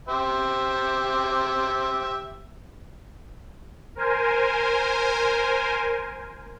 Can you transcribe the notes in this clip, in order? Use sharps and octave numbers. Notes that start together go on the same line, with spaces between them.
G4 C5 E5
A#4 C5 G#5